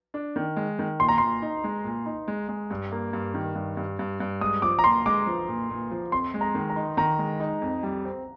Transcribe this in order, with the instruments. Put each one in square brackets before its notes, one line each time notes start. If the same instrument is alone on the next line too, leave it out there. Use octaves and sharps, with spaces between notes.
[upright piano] D4
D#3
G#3
D#3
[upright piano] A#2 [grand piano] C6
[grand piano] A#5
[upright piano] A#2 [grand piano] C6
[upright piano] D#4
G#3
A#2
D#4
G#3
G#3
G2
A#3
G2
D#3
G2
G2
G2
G2
[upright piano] G#3 [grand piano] D#6
[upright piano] F3 [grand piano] D6
[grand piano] A#5
[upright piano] A#2 [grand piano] C6
[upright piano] G#3 [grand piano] D6
[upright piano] F3
A#2
A#2
F3
[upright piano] F2 [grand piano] C6
[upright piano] G#3
[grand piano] A#5
[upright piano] D#3
[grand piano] A#5
[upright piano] D#4
[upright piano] D#3 [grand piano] A#5
[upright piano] G#3
D#4
F2
G3
C4